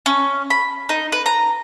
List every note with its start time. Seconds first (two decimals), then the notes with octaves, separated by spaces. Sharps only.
0.06 C#4
0.50 B5
0.89 D#4
1.12 B4
1.26 A#5